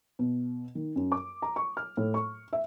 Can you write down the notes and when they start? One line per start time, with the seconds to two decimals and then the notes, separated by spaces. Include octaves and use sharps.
0.19 B2
0.75 D#3
0.96 F#2
1.12 D6
1.42 A#5
1.56 C#6
1.77 F6
1.97 A2
2.14 C#6
2.53 E5